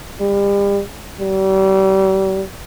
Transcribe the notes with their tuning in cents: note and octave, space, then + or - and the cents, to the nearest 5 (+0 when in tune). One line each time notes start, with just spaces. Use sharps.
G3 +35
G3 -35